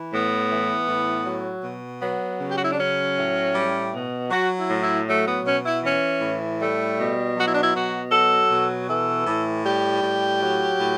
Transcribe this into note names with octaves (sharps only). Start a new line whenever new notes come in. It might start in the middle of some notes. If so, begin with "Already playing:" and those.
Already playing: E3
A2 B3
E3
A2
F#3
B2
F#3 B3
C#3
G4
F#4
E4
D4
F#3 C#4
A2
G3
B2
F#3 F#4
E4
A2
E4
F#3 A3
B3
B2 C#4
E4
E3 C#4
A2
G3 A3
B2
F#3 F#4
E4
D4
E4
B2 F#4
F#3 A4
B2
E3 A4
A2
G3 G4
A2
F#3
A2